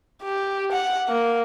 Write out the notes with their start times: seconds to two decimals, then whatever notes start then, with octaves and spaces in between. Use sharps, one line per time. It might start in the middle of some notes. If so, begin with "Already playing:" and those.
0.23 G4
0.71 F#5
1.09 A#3